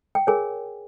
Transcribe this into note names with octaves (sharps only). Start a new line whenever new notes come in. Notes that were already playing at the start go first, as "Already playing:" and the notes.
G5
G#4 A#4 C#5 G#5